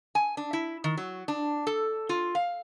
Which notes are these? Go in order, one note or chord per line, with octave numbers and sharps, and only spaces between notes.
G#5
D4
E4
D#3
F#3
D4
A4
F4
F5